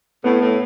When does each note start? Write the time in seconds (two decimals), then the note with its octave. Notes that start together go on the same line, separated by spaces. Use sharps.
0.24 A2 B3
0.42 A2